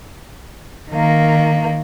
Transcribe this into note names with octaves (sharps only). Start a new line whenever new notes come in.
D#3 A#3